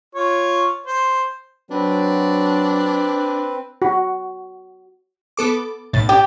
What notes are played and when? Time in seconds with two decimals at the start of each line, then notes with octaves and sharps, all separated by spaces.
0.15 F4 C#5
0.86 C5
1.71 F#3 C4 D4 B4
3.82 F#4
5.37 B3 A4 D6
5.93 B1 A2 A6
6.09 G4